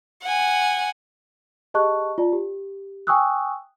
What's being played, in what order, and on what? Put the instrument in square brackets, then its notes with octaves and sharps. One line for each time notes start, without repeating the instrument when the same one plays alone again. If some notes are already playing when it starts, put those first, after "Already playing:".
[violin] F#5 G#5
[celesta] G4 G#4 D#5 A5 C#6 F#6
F4 D5 A5
G4
G5 G#5 C#6 D#6 E6 F#6